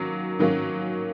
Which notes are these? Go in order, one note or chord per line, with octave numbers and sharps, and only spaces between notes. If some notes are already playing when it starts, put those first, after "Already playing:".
Already playing: D#3 F#3 A#3 C#4
D#3 F#3 A#3 C#4